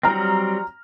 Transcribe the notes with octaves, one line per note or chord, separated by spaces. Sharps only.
F#3 G3 C4 A#5 F6 A#6